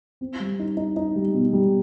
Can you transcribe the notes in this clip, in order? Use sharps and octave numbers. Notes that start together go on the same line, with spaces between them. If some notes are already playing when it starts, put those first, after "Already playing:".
C4
G3
D#4
D#4
D#4
G3
B2
G3